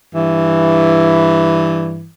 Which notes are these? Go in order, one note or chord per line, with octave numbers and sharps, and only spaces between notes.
G2 E3